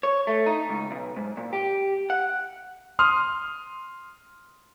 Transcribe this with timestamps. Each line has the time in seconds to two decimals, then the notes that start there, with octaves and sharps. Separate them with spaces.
0.03 C#5
0.27 A3
0.46 D#4
0.69 C#2
0.91 B1
1.17 G#2
1.37 A#2
1.53 G4
2.10 F#5
2.99 C6 D#6 F6